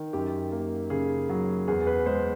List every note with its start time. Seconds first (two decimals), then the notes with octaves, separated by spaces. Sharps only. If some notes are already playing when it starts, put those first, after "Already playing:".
Already playing: D#3
0.13 F#2 G4
0.52 A#3
0.90 C#3 G#4
1.29 F#3
1.68 E2 G#4
1.87 B4
2.06 G#3 C5